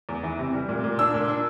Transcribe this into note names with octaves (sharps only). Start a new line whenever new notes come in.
E2
E3
C3
G3
A#2
A#2
D4 E6
A#2
D4